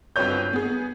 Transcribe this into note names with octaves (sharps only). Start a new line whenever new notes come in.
G1 C4 F#4 B4 C#5 G6
B3 G#4